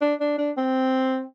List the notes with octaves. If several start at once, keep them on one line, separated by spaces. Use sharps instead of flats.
D4
D4
D4
C4